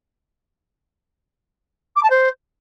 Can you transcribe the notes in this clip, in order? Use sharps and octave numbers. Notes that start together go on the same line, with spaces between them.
D6
A5
C5